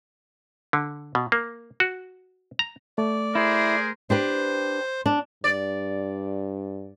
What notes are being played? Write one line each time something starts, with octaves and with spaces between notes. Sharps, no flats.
D3
B2
A#3
F#4
A#5
A3 D5
E4 G#4 A#4 C5
D4 G4 B4 C5
D4
G2 D5